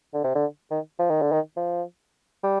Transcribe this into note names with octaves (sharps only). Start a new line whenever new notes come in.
D3
C3
D3
D#3
F3
D#3
D3
D#3
F3
G3